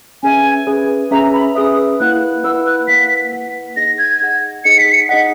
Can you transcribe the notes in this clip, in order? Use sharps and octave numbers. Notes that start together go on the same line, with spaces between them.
C#4 G#4 B4 E5 G#5
C#4 G#4 B4 E5
C#4 G#4 B4 E5 A#5
B5
C#4 G#4 B4 E5 D#6
A#3 E4 B4 F#5 F#6
A#3 E4 B4 F#5 E6
F#6
A#3 E4 B4 F#5 B6
A#3 E4 B4 F#5
D#4 G#4 D#5 F#5 A#6
G#6
D#4 G#4 D#5 F#5
D#4 G#4 D#5 F#5 C#7
B6
C#7
D#4 G#4 D#5 F#5 B6